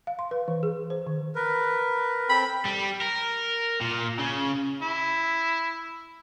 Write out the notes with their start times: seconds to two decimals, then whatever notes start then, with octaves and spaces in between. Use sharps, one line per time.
0.07 F5
0.19 C6
0.31 B4
0.48 E3
0.63 G#4
0.90 C5
1.07 D#3
1.35 A#4 B4
2.29 C4 A4 G5 B5
2.66 G3
3.02 A#4
3.81 A#2
4.19 C#3
4.82 E4